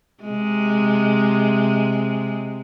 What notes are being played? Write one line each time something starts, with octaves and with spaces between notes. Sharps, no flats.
C3 G#3